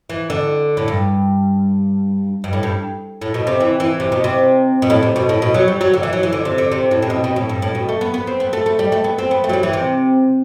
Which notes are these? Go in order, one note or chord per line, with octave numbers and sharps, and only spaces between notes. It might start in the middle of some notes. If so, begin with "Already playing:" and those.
E3
D3
A2
G2
G2
A2
G2
A2
B2
C3
E3
E3
C3
B2
C3
B2
A2
C3
B2
A2
B2
F#3
G3
F#3
D3
E3
F#3
E3
D3
C3
D3
C3
A2
C3
B2
B2
A2
G2
A2
B2
A3
B3
B3
C4
B3
A3
A3
G3
A3
B3
C4
B3
A3
F#3
G3
E3
C3